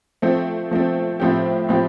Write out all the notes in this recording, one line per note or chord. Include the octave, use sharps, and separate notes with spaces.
F3 A3 C4
F3 A3 C4
A2 F3 C4 G4
A2 F3 C4 G4